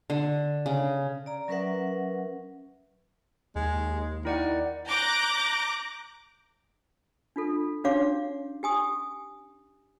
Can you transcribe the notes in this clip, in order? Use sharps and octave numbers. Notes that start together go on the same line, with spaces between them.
D3
C#3
D5 A#5
F#3 C#4 A#4 B4 E5 F#5
D#2 G#3
D#3 E4 D5 F#5
A#5 D6 F#6 G6 A#6
D4 F4 A4
C#4 D4 F#4 C#5 F5 D6
G4 G#5 D#6